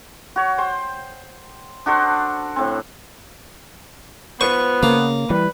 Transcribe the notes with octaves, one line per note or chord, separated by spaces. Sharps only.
F#4 C#5
C5 G5
D4 F#4 A4 C5
A2 C4
B3 F4 B4 C5 C#6
C#3 A#3
E3 G3 B4